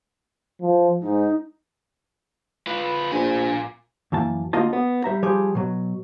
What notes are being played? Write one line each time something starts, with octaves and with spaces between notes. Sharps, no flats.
F3
G#2 D#4
F4 B4
A#1 A#2 G#5
F#2 E3 A#3 A5
D2 A#3 F4 D#5 A5
B3
G3 E5 A#5
F3 G3 G4 G#4
B2 F#3